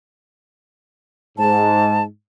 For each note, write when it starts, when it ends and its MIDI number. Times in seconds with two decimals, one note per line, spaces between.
1.38 2.03 44
1.38 2.03 81